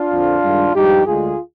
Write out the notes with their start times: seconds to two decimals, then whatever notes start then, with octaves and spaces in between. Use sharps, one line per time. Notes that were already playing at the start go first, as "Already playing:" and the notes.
Already playing: D4 F4
0.11 F2 D3 F3
0.43 G2 D#3 G#3
0.75 G2 F3 G#3 D#4 G4
1.06 D2 D3 G#3 F4 G#4